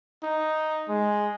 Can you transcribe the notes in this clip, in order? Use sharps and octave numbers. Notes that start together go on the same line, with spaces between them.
D#4
G#3